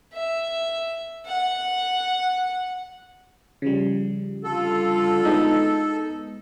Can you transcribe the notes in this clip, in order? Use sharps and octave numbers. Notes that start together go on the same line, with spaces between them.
E5
F#5
C#3 F3 G3
D3 F4 A4
G#3 B3 D#4